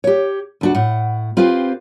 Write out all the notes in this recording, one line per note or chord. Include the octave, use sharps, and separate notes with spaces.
G4 C#5
D2 D4 F#4
A2 F#5
C4 F4 G4 B4 C5